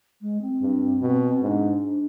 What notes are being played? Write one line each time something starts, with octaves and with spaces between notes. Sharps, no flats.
G#3
C4
G2
B2
G#2 D4
D4